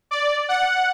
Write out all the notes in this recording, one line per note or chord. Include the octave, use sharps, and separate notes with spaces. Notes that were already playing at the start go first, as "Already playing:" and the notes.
D5
F#5